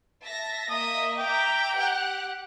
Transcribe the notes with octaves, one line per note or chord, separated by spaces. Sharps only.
E5 A5 A#6
A#3 D#5 E5 D#6
E5 G5 A#5 D6
G4 F#5 F#6